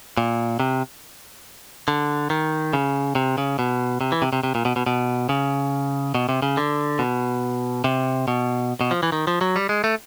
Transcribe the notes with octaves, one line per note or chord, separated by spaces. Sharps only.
A#2
C3
D3
D#3
C#3
C3
C#3
B2
C3
E3
C3
C3
C3
A#2
B2
B2
B2
C#3
B2
C3
C#3
D3
B2
C3
B2
B2
F3
E3
D#3
F3
F#3
G3
G#3
A3